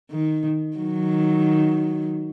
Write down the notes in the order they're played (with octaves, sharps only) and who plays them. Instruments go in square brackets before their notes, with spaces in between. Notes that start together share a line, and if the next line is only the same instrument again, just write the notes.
[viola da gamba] D#3
D#3 F#3